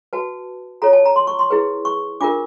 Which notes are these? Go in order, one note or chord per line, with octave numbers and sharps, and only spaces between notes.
F#4 B4 A5
F4 A4 C#5 A#5
A5
A#5
C6
C#6
C6
E4 G#4 B4
C#6
D4 F4 A#4 D6